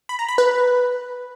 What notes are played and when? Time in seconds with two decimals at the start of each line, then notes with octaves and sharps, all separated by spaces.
0.09 B5
0.19 A#5
0.29 B5
0.38 B4